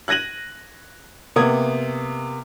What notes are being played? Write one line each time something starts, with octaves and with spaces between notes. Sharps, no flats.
F#6 G#6 A#6 D#7 F#7
C3 A#3 B3 D#6 G#6